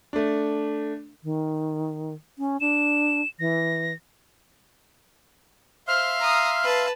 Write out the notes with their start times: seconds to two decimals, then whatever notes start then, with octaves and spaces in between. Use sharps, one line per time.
0.13 A3 D4
1.23 D#3
2.38 C#4
2.61 D4 E7
3.39 E3 A#6
5.88 C5 E5 F5 C6 F6
6.19 A#5 D#6
6.64 B4 A5